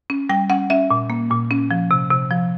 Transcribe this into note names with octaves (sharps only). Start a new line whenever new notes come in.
C#4
G3 G5
C#4 F#5
C#4 E5
A#2
A#3
A#2
C#4
F3
C3
C3
F3